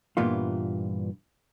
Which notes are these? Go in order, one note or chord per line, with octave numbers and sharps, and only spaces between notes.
G2 A#2 E3 B3 F4